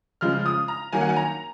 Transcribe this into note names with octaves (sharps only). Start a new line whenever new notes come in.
C#3 F3 G#3 F6
D#6
A#5
D#3 F#3 A#3 G#5
F#5
G#5
A#5